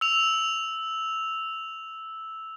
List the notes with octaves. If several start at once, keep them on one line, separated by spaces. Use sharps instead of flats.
E6 F7